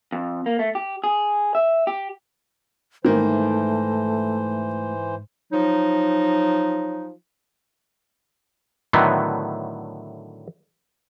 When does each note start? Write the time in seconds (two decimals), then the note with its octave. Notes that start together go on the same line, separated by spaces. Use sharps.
0.12 F2
0.46 A#3
0.59 A3
0.75 G4
1.04 G#4
1.55 E5
1.87 G4
3.05 G#2 D#3 E3 A3 A#3 C5
5.52 F3 F#3 D#4
8.93 A2 D3 D#3 F#3 A3 B3